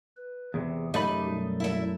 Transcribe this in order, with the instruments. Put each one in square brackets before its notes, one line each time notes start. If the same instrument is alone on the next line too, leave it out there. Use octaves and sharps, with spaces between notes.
[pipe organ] B4
[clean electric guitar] E2 A2 C3 [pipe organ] G#4
[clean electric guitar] F#2 A3 B5 [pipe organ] C3 G4 [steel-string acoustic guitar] D#4 D#5
[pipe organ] B2 G3
[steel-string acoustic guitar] E4 E5